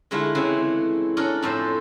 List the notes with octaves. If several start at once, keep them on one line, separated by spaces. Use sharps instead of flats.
D3 G#3 A3 E4 F4
C#3 E3 C4 E4
C#4 D4 A4 A#4
F2 A2 A4 C5